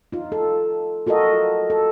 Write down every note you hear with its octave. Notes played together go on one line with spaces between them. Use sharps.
D#4 F4
A4
F4 F#4 A4 A#4 D#5
A4